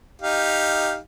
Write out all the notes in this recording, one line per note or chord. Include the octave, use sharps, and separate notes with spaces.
D#4 G4 F5